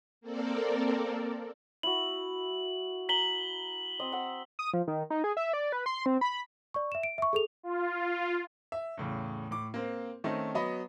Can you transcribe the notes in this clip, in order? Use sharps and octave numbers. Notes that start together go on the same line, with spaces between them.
A#3 C4 A4 A#4 D5
E4 F#4 F#7
A#5 B6 F#7 G7
C4 D#5
F#5 E6
D#6
F3
D#3
D#4
G#4
E5
D5
B4
C6
C4
B5
D5 C#6
E5 E7
D7
E5 C#6
G#4 A4 F7
F4
E5
E2 A2 C#3
A2 D6
A#3 C4
D#3 A3 C4 C#4 D#4
F#3 B3 D#5 B5